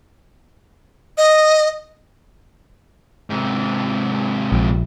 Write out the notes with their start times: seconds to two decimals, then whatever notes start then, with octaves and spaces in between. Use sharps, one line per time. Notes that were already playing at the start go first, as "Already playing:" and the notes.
1.17 D#5
3.30 G#2 C3
4.52 A#1